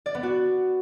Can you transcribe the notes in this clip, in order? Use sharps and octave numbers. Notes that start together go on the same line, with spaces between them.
D5
B3
F#4